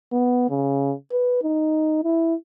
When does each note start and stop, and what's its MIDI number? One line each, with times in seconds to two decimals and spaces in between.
0.12 0.47 59
0.49 0.93 49
1.12 1.42 71
1.42 2.04 63
2.04 2.35 64